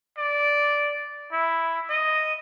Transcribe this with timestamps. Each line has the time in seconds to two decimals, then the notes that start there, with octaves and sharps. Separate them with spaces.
0.18 D5
1.32 E4
1.90 D#5